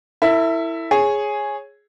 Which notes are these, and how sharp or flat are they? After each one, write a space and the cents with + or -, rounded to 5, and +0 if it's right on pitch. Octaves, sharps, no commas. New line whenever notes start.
E4 +0 A4 +45
G#4 +0 C#5 -10